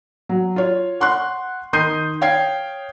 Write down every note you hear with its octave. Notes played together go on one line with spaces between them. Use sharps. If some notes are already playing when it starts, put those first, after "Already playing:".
F#3
F4 C#5
F#5 C6 C#6 F#6
D#3 C6 D#6 G6 C7 D#7
C#5 F5 G5 G#6 C7